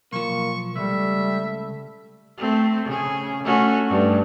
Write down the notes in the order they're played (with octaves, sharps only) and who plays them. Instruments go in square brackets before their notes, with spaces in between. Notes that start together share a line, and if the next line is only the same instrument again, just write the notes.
[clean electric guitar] B1 F3 [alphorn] A#3 [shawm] C#6
[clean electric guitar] C#2 [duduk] G3 [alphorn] A3 [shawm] E5
[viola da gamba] A3 C4
C#3 G#4
A3 C#4 F#4
G2 A3